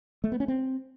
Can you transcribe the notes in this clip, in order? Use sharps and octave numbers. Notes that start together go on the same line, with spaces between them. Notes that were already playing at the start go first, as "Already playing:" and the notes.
A3
B3
C#4
C4